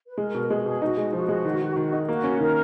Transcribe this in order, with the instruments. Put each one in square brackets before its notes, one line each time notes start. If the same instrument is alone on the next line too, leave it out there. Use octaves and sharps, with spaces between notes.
[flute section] B4
[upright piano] G#3 [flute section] A#4
[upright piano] B2
[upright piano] G#3 [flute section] G#4
[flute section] F#4
[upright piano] B2 [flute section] G#4
[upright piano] D#4 [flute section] F#4
[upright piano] G#3
[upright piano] F3 [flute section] F#4
[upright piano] G#3
D#3
D#3
D#3
D#4
[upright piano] A#3 [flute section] F#4
[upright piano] C#4
[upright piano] D#3 [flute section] A#4